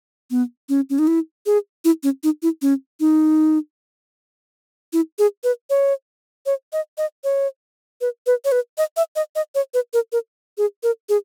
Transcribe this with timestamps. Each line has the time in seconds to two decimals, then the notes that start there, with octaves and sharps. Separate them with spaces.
0.31 B3
0.69 C#4
0.90 C#4
0.99 D#4
1.07 E4
1.46 G#4
1.85 E4
2.03 C#4
2.23 D#4
2.43 E4
2.62 C#4
3.00 D#4
4.93 E4
5.19 G#4
5.44 B4
5.70 C#5
6.46 C#5
6.73 D#5
6.98 D#5
7.24 C#5
8.01 B4
8.27 B4
8.45 C#5
8.52 B4
8.78 D#5
8.97 E5
9.16 D#5
9.36 D#5
9.55 C#5
9.74 B4
9.93 A#4
10.12 A#4
10.58 G#4
10.83 A#4
11.09 G#4